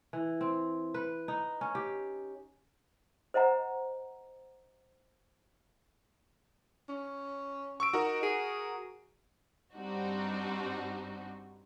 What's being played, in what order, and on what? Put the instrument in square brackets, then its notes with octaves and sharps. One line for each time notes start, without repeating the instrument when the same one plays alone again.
[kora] E3
C4
B4
D#4
C#4
G4
[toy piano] C5 D#5 F#5 A#5
[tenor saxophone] C#4
[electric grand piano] C#6 E6 D7
[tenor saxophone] D#4 [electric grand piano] F#4 A#4
[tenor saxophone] G#4
[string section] G2 G3 C4 D4 D#4 F#4